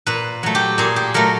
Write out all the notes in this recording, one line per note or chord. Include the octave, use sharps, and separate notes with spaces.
A#2 B4
F#3 A3
G4
A#2 G#4
G4
F#3 A3 A#4